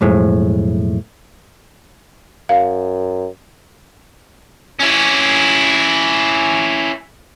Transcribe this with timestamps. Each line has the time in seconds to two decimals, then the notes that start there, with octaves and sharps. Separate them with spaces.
0.01 B1 F2 A2 G#3
2.49 F#2 F5
4.80 C#4 E4